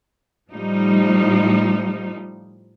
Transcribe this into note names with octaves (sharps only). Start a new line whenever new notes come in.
A2 F3 G3 A3 D#4